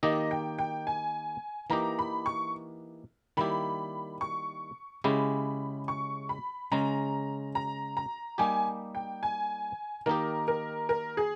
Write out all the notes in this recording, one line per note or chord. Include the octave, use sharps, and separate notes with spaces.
D#3 A#3 D#4 G4 D#5
G5
G5
G#5
E3 A#3 D#4 G4 A#5
B5
C#6
D#3 G3 A#3 E4 G4 B5
C#6
C#3 G#3 C#4 E4 G4 B5
C#6
B5
C#3 G#3 C#4 A#5
A#5
A#5
G3 A#3 D#4 G4 G#5
G5
G#5
D#3 A#3 D#4 G4 A#4
A#4
A#4
G#4